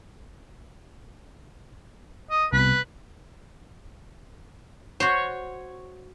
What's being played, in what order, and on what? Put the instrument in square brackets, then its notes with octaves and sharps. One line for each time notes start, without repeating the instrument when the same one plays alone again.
[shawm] D#5
[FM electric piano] C2 B2 [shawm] B4
[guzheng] F#4 C5 [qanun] C#5